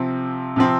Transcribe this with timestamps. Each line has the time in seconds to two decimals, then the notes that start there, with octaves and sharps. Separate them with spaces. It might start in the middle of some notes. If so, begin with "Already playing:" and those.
Already playing: C3 F3 C4
0.56 C3 F3 C4